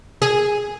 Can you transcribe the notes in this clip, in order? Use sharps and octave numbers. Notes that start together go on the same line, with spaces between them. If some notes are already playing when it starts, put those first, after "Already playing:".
G#4